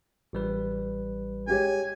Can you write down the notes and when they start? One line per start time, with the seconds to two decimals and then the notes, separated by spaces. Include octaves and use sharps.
0.33 A1 G3 B4
1.47 G#3 G4 C#5 G#5